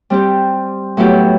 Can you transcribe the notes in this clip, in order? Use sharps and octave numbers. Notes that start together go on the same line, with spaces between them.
G3 C4 G4
A2 F#3 B3 E4 G4